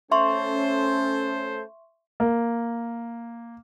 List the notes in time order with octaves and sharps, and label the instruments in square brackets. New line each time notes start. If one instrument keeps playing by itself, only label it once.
[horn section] A3 A4 C5 [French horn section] C#4 [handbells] E5 C6 C#6
[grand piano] A#3